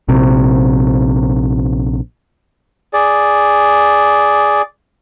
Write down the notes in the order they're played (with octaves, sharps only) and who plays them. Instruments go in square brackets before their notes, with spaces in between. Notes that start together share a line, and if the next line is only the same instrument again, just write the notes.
[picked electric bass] A#1 C3
[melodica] G#4 D5